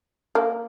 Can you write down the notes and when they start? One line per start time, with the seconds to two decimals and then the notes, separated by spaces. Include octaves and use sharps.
0.35 A#3